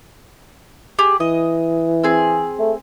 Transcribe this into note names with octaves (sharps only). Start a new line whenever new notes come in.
G4 G#4
E3 D#5
C4 G#4
A3